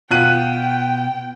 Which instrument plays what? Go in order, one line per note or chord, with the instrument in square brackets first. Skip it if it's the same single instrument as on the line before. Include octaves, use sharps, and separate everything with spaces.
[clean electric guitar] B2 B3 [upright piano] F4 F#6 D#7 [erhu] G5